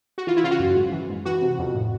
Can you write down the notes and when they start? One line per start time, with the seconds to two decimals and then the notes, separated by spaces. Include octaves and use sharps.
0.18 F#4
0.27 E3 F4
0.37 E4
0.44 C#3 F4
0.51 F#4
0.60 F#2
0.76 G#2
0.92 E3
1.09 G#2
1.25 E3 F#4
1.42 C3
1.59 F2
1.75 A2